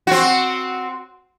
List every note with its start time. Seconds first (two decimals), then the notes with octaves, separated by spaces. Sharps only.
0.07 C4 F#4